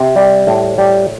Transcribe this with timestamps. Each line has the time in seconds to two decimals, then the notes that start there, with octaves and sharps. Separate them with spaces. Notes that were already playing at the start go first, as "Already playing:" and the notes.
Already playing: C3
0.16 G3
0.47 A2
0.78 G3